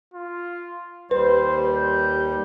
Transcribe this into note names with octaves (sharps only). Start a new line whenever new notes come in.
F4
D#2 G3 B4 C5
G6